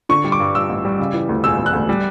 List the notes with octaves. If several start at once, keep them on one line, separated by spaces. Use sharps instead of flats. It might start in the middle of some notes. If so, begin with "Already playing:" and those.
D3 C#6
G3
D6
G2
G2 E6
A1
G3
C#3
E3
D2
E1 E6
E1
F#6
D2
G3